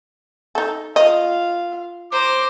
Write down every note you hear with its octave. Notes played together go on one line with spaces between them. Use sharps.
D#4 A4
F4 D#5 F5
C5 A#5 D6